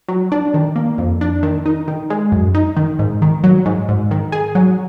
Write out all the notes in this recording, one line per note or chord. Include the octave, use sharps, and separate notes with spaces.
F#3
D4
D#3
A#3
F2
D4
D#3
D#4
D#3
G#3
F#2
D#4
D#3
G#2
D#3
F#3
G#2
G#2
D#3
G#4
F#3